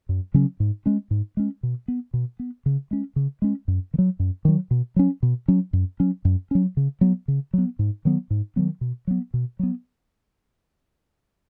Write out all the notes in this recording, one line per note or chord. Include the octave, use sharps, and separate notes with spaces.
F#2
C#3 F#3 C#4
G#2
G#3 C#4
G#2
G#3 C#4
B2
B3
B2
B3
C#3
G#3 C#4
C#3
G#3 C#4
F#2
D#3
F#3
F#2
D#3 F#3
B2
F#3 C#4
B2
F#3 C#4
F#2
F#3 C#4
F#2
F#3 C#4
C#3
F#3 B3
C#3
F#3 B3
G#2
D#3 F#3 B3
G#2
D#3 F#3 B3
B2
F#3 B3
B2
F#3 B3